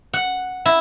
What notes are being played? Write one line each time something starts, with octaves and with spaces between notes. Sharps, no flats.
F#5
E4